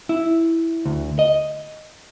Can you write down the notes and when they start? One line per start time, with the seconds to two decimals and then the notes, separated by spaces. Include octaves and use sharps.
0.09 E4
0.86 D2
1.19 D#5